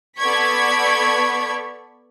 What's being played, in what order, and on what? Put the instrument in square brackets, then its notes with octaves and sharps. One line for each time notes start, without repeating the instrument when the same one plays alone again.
[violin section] B3 A4 D5 C#6 G#6 B6